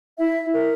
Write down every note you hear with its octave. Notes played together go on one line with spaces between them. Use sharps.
E4 E5
A#4